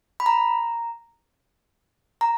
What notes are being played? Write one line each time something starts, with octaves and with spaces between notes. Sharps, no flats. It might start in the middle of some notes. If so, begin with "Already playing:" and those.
B5
A#5
A#5